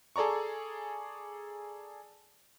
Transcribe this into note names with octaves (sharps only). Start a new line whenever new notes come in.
G#4 A4 D5 A#5 C#6